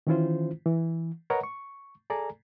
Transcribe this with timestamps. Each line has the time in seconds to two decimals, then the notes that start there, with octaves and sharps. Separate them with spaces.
0.07 D#3 E3 C#4 E4 F4 C5
0.66 E3
1.30 A#4 B4 C#5 D#5 F#5 A#5
1.43 C#6
2.10 G#4 A4 D5 G#5 A#5